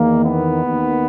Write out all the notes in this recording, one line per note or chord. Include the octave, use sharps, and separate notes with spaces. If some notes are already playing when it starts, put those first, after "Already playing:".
Already playing: E2 D#3 A#3
B3
D#2 D#3